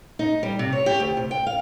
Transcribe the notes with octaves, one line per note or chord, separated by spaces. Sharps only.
D#4
G3
C3
C#5
G4
D2
C3
G5
F5